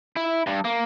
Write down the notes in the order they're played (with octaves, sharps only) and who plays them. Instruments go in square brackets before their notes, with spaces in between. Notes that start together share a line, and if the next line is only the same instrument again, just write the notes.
[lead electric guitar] E4
G2
A#3